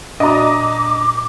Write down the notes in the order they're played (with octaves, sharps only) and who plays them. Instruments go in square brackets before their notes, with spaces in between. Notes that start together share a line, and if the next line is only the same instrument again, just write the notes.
[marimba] A#2 F#4 [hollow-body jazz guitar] D4 [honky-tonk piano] D#5 A#5 [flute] D6